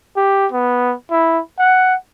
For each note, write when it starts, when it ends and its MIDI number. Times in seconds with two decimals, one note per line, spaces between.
0.17 0.46 67
0.52 0.94 59
1.11 1.41 64
1.59 1.95 78